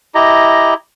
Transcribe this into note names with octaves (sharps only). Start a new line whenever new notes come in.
E4 G4 D#5 A#5